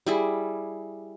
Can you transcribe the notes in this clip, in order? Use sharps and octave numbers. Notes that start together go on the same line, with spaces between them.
G3 E4 G#4